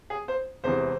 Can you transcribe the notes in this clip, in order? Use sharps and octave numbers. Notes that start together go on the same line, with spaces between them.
G#4
C5
E1 E2 C3 E3 C5